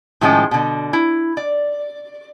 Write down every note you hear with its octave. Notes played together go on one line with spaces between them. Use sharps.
A2 D#3 F3 G#3 C#4 G5
B2 D3
E4
D5